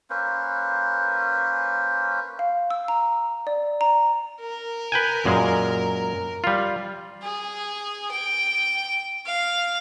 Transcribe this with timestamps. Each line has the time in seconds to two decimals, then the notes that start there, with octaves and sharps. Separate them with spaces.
0.10 A#3 C#4 B4 C5
2.39 F5
2.71 E6
2.88 A#5
3.47 D5
3.81 A#5
4.41 A#4
4.92 B4 G5 G#5
5.25 F#2 A#2 G#3
6.44 G3 F4
7.23 G#4
8.11 G5
9.26 F5